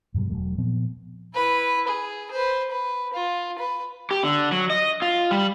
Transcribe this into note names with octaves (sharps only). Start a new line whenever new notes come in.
G2 B2 F#3 G3
E1 D#2 F#3 A3
A#2 F3 B3 C4
E4 B4
G#4
B4 C5
B4
F4
B4
G4
D3
F#3
D#5
F4
G3